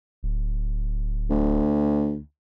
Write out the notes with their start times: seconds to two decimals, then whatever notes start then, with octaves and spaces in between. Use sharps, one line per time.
0.23 D1
1.30 D2